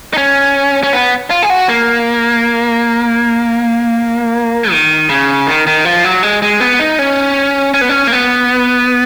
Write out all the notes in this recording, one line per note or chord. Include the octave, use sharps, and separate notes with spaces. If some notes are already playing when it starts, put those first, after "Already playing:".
D#4
C#4
C#4
B3
F4
G#4
F#4
A#3
D#3
C#3
D#3
D#3
F3
F#3
G#3
G#3
B3
D#4
C#4
C#4
B3
C#4
A#3
B3